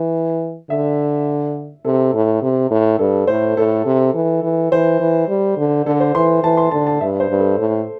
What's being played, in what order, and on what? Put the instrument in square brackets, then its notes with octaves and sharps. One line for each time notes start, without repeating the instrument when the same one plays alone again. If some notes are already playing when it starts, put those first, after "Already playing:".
Already playing: [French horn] E3
[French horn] D3 [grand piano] E5
[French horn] C3 [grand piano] A4
[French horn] A2
C3
A2
[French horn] G2 [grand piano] A4
[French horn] A2 [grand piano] C5
[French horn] A2 [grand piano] A4
[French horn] C3
E3
E3
[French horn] E3 [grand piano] C5
[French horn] E3
G3
D3
[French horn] D3 [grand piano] A4
[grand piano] C5
[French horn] E3 [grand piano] C6
[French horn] E3 [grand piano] A5
[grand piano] C6
[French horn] D3 [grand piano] A5
[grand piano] A5
[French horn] G2 [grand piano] E5
[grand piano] C5
[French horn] G2
[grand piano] A4
[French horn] A2